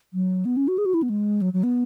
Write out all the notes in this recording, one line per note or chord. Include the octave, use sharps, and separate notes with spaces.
F#3
B3
C#4
F#4
G#4
F#4
E4
B3
G#3
F#3
F#3
B3